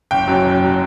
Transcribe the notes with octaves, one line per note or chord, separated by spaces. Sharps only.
F#1 G5
F#2 F#3
F#1
F#3